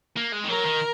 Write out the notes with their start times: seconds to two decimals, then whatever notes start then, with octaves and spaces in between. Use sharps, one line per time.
0.17 A#3
0.33 G#3
0.44 D#3
0.49 F#3 A#4
0.65 D#3